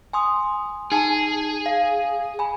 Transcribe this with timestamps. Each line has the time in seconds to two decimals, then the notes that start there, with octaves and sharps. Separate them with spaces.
0.13 G#5 C6 D#6
0.92 D#4 G#4 G#5 A5
1.66 F5
2.39 G#5 B5